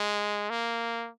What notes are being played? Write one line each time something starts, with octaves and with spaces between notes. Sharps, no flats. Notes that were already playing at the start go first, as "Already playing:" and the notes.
Already playing: G#3
A#3